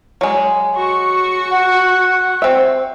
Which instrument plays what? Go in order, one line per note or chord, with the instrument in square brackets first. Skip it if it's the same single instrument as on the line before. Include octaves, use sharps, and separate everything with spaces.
[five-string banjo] F#3 G#3
[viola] F#4 C#6
[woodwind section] F#5
[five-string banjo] C4 E5